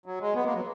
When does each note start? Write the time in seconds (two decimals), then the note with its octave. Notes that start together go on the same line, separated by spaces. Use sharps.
0.06 F#3
0.21 G#3
0.35 B3
0.45 A#3
0.55 F#3